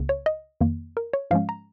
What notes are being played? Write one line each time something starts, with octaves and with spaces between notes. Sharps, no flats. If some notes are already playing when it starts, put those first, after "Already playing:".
Already playing: C#2 C#3 A#3
C#5
D#5
F2 D#3 A#3
A#4
C#5
G#2 F3 G#3 C#4 F5
A#5